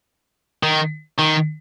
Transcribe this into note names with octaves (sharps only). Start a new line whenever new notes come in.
D#3
D#3